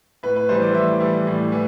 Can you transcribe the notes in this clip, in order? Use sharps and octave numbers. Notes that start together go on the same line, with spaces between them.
A2 B4
B4
E3 G3 C5
D5
A2 E5
E3 G3
A2
E3